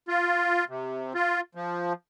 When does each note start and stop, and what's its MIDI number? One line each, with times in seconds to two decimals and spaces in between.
0.08 0.65 65
0.69 1.13 48
1.15 1.41 65
1.55 1.93 53